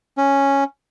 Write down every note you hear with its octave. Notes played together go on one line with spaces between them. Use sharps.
C#4